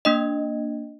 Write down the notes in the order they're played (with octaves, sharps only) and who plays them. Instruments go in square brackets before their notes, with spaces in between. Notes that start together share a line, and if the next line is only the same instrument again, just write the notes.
[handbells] A#3 D4 D#5